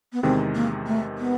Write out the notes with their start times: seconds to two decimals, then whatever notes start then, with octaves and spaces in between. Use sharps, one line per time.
0.13 B3
0.23 E2 C3 D#3 G#3 C4
0.55 A#3
0.86 A3
1.18 B3